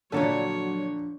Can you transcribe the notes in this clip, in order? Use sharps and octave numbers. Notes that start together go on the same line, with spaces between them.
A#2 D3 F3 F#3 D4 A4 B4 C#5